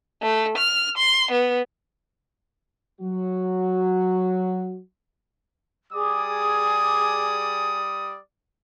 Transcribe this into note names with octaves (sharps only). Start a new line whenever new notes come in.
A3
F6
C6
B3
F#3 F#4
G3 G#4 D5 D6 D#6